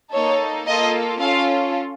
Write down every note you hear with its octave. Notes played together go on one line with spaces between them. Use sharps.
A#3 D#4 A4 C#5
A#3 F4 A4 D#5
C#4 F4 A4 F5